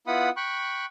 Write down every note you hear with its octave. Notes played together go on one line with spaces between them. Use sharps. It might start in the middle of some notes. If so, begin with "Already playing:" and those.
B3 E4 F4 F#5 B5 D#6
G5 B5 C#6 F#6